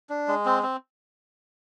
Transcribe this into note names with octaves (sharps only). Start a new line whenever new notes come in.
D4
G#3
C4
C4